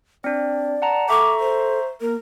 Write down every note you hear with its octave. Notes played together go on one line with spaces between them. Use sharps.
C4 D4 D5
F#5 A5 A#5
A4 E5 A#5 C#6 D6
C5
A#3 A#4